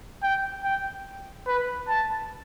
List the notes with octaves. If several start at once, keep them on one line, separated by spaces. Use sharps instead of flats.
G5
G5
B4
A5